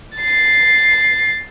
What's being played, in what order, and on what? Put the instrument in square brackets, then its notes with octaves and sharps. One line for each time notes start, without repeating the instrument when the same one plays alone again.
[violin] A6 C7